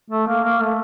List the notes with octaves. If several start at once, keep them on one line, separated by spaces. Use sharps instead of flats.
A3
A#3
A#3
A3